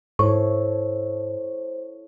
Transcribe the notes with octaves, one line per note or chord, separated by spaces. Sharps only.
G#2 E4 A4 C5 C#5 C#6